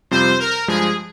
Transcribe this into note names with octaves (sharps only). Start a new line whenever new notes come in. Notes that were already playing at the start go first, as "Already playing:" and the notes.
F2 C3 G3 C4 F4 C5
A#4
G2 F3 G#3 G#4